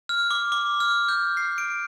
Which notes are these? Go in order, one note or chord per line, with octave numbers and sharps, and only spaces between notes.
F6
D6
D6
F6
G6
C7
D7